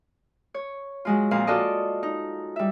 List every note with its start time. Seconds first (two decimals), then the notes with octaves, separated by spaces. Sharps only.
0.54 C#5
1.05 F#3 G#3 F4
1.31 F2 A#2 F5
1.47 F4 F#4 A4 D5 D#5
2.03 D#4
2.56 G3 E5